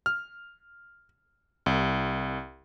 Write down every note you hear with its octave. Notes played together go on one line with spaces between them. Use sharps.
F6
C2